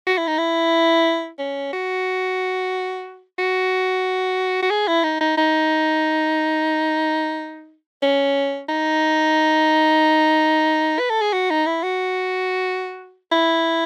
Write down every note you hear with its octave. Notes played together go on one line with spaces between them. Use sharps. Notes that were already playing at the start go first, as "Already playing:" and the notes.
F#4
E4
D#4
E4
C#4
F#4
F#4
F#4
G#4
E4
D#4
D#4
D#4
C#4
D#4
B4
A4
G#4
F#4
D#4
E4
F#4
E4